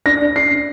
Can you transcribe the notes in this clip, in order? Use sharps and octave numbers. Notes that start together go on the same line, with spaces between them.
D4 A#6
D4
D4 C7
D4